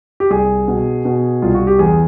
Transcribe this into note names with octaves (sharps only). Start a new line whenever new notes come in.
G4
C2 G#4
B2
B2
C2 F4
F#4
G4
E2 G#4